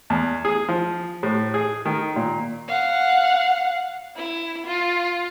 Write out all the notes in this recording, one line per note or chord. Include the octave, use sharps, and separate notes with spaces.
E2
G#4
F3
A2
G#4
D#3
A#2
F5 F#5
E4
F4